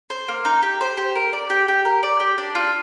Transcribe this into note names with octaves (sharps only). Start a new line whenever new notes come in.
C5
A#3
D#4
G4
C5
G4
A#4
D5
G4
G4
A#4
D5
G4
D4
F4